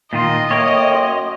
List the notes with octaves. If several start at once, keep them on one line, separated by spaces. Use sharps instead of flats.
A#2 D#3 F4 D#5
A2 A#3 C#5 G5 D#6 D7
F#2 C6